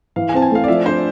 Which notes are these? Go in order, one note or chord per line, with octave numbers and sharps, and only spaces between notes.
E3 F5
G#5
C4 A5
G#5
A3 F5
D5
F3 E5
D4 C5